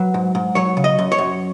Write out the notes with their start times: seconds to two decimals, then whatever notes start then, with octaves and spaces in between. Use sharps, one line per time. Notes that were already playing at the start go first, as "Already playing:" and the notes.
Already playing: F#3 B4
0.14 G#2
0.35 G#2
0.55 F#3 C#5
0.77 C#3
0.84 D#5
0.99 F#2
1.12 C#5
1.18 F#2